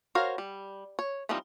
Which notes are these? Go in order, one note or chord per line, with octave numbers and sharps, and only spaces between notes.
F#4 A#4 C5 C#5 F5
G3
C#5
E3 F3 G3 C4 D#4